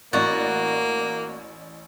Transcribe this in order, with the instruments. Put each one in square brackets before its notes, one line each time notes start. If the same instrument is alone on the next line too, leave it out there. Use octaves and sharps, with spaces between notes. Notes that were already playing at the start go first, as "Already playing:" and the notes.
[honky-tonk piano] A1 D5 A6 [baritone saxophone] A#3 [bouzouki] F#4